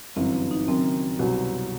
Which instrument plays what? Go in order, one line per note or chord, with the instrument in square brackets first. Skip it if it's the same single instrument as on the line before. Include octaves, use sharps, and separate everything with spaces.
[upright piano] G1 F#2 E3 [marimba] C4
[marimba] D#4
[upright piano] F#1 F#2 D#3 [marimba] C4
[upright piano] C2 B2 F#3 C4